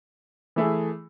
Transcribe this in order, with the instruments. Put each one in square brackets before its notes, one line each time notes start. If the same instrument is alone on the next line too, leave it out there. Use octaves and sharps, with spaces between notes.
[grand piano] E3 A3 E4 G#4